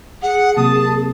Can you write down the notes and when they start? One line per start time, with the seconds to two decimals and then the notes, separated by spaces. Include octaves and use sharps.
0.22 G#4 F#5
0.57 C3 F#3 A#3 A5 D#6